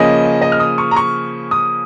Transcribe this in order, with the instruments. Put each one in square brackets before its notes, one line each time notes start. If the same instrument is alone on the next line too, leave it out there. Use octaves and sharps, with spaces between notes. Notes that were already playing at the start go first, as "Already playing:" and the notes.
Already playing: [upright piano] C#3 F3 A#3 C#4 D#5
D#5
F6
D#6
C#6
A#5
C#6
D#6